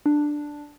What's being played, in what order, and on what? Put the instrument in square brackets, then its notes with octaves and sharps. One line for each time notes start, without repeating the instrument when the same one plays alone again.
[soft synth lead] D4